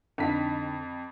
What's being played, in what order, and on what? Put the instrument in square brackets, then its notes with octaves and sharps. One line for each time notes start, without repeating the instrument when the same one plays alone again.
[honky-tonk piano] F2 B6 [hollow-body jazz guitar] D3 D4 D#4